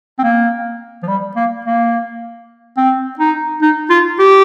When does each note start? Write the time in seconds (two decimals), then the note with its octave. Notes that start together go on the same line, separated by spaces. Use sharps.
0.19 C4
0.23 A#3
1.03 F3
1.08 G3
1.36 A#3
1.65 A#3
2.77 C4
3.19 D#4
3.62 D#4
3.90 F4
4.19 G4